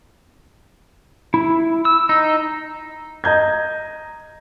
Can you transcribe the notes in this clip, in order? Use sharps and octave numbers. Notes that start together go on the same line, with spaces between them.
E4
E6
D#4
D#5 A#5 G6 G#6